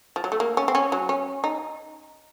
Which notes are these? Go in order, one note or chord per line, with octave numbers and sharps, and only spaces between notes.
F3
F#3
A3
A#3
C#4
C4
C#4
F#3
C#4
D#4